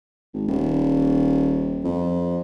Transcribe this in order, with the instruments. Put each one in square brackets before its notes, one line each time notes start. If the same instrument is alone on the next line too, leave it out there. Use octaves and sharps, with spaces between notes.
[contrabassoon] G#1
D#1
F2